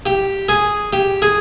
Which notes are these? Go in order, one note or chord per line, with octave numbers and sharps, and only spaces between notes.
G4
G#4
G4
G#4